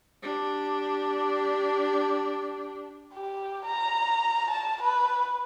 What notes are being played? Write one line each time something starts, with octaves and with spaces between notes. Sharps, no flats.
D4 G4
G4
A#5
A5
B4